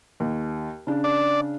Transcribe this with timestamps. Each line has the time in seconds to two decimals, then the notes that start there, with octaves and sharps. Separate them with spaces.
0.20 D#2
0.87 C#3 D4
1.04 D5